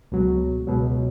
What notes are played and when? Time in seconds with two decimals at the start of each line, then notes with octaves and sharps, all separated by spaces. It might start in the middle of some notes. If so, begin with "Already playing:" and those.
0.12 C#2 B2 F#3
0.67 C#2 B2 F#3